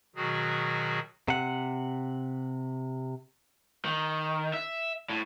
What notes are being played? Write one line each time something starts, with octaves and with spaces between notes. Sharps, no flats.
B2 D#3 F#3 F#4 G#4
C3 F#5
D#3
E5
A2